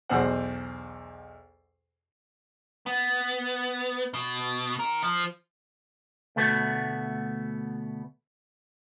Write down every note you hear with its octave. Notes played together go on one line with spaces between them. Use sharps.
B1 E2 B2 C5 F#5
B3
B2
D#3 A#4
F3
D2 B2 A3 B3 F#4